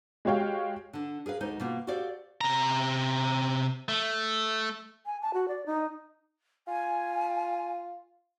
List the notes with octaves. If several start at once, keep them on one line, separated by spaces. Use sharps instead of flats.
G#3 F#4 G4 C#5 F5 G5
D3 D4
G#4 A#4 B4 F5
D2 G#3 D#4 C5
B2 A#3 F4
F#4 G4 A4 C5 D5 F5
C3 A#5
A3
G#5
A5
F#4
D5
D#4
F4 G#5